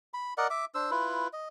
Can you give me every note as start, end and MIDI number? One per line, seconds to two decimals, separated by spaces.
0.14 0.34 83
0.38 0.47 70
0.38 0.47 74
0.38 0.47 75
0.38 0.47 78
0.50 0.65 76
0.50 0.65 86
0.75 0.91 62
0.75 0.91 72
0.75 0.91 88
0.91 1.28 64
0.91 1.28 65
0.91 1.28 71
1.33 1.48 75